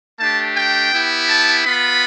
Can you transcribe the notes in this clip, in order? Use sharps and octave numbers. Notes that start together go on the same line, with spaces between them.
A3 D4 G4 A5
G5
B3 E4 G4
A5
B3 F4 B5